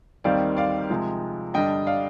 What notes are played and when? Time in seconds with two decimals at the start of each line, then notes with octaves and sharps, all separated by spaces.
0.24 D#2 D#3 G3 C4 D#4 D5 F5
0.57 D5 F5
0.90 C3 F3 G#3
1.54 G2 D3 G3 D4 D#5 G5
1.87 D5 F5